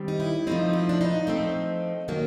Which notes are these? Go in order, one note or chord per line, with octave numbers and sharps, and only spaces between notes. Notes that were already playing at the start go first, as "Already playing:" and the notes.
Already playing: D#3 G3 C4
D#4
E4
F3 A3 C4 D#4
E4
D4
D#4
F3 A3 C4
D#3 F#3 A#3 C#4